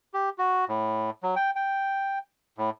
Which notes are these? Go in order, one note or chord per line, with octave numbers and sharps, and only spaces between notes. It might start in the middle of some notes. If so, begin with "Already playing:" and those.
G4
F#4
A2
F#3
G5
G5
A2